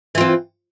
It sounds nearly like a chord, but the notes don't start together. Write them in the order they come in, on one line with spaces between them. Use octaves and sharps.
E3 F4 C4